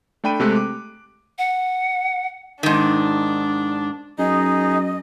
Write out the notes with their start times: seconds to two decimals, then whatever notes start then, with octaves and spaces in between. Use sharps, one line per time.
0.24 A3 D4 G5 B5 D#7
0.40 C3 G#3 A3 G4 D6 F#6
0.56 D6
1.38 F#5
2.63 G#2 D#3 D4
4.18 F#2 D#4 G#4 D#5